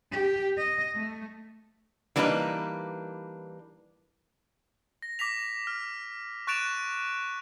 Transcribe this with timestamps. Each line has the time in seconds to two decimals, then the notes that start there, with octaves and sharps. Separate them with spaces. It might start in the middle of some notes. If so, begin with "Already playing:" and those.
0.12 G4
0.58 D#5
0.95 A3
2.16 E3 G3 A#3 D4 D#4 B4
5.02 A#6
5.19 D6 A#6 B6 F7
5.67 F6
6.47 C#6 F#6 A6 D7 E7 F7